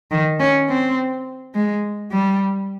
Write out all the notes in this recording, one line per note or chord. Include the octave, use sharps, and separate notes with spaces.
D#3
C#4
C4
G#3
G3